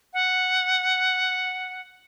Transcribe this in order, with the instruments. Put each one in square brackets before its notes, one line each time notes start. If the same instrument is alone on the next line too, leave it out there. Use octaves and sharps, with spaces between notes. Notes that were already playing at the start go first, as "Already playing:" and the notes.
[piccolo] F#5